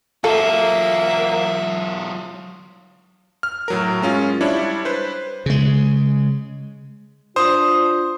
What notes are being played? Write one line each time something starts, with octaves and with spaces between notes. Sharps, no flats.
F#3 A#3 F4 A4 E5
F6
A2 F#3 A#4
G#3 C#4 F4
G3 D4 E4 C#5
B4 C5
C#3 G#3
D4 F4 C5 D#6